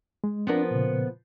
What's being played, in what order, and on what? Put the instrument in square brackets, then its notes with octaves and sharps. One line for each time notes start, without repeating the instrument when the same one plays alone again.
[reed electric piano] G#3
[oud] F3 B3 A#4 [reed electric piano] C4 D4
[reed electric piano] A#2 C#3